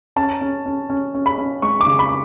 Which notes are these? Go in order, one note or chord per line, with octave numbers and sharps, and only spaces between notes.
C#4 A5
C#4
C#4
C#4
C#4
B5
C#4
G#3 C#6
D6
C#3
B5
D6